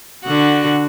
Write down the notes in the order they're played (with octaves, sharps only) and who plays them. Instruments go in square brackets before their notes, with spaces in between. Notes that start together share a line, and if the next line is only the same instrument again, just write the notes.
[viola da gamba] D3 F#4